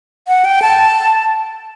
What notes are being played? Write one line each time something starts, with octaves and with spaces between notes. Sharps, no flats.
F#5
G5
A5